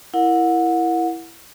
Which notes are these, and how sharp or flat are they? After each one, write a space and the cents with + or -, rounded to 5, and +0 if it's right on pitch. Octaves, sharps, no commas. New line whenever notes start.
E4 +5 A#4 +0 F#5 -25